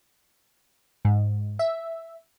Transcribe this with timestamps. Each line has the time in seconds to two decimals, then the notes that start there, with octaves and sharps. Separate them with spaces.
1.05 G#2
1.59 E5